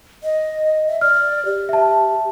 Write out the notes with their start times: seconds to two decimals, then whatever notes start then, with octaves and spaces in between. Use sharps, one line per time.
0.23 D#5
0.87 E5
1.01 D5 F6
1.45 G4
1.69 E5 A5